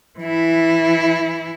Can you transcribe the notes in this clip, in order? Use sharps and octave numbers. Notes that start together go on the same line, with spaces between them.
E3 E4